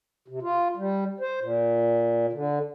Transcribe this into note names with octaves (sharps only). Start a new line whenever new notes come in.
C3
F4
G3
C5
A#2
D3